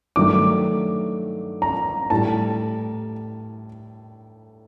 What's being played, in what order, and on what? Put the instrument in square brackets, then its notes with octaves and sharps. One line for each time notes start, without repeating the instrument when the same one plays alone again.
[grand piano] G2 D#3 F#3 A3 D6
A#5
A2 G3 A5